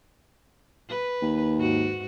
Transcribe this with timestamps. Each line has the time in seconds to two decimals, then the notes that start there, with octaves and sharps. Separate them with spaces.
0.89 B4
1.22 D#2
1.59 G#2 F#4